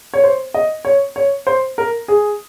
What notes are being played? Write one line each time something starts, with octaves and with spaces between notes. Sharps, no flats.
C#5
C5
D#5
C#5
C#5
C5
A#4
G#4